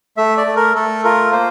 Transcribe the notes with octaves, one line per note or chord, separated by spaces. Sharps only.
A3 E5
D5
A3
A#4
A3 A4
F4 A#4
A#3 C5